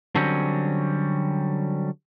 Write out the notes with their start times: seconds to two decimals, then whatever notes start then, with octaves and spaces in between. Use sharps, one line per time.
0.15 D3 F#3 G3 C4 C#4